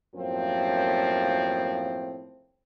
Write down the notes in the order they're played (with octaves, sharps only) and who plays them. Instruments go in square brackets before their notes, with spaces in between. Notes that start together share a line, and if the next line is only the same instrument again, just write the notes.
[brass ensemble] F#2 A2 F3 A#3 C4